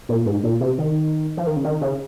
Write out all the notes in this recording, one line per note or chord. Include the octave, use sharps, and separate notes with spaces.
A#2
G#2
A#2
C3
D#3
F3
D#3
C#3
D#3
C#3